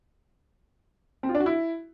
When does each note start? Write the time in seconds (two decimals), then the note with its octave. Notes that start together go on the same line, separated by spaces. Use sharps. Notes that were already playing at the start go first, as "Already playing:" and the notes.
1.23 C4
1.29 F4
1.35 D4
1.40 F#4
1.46 E4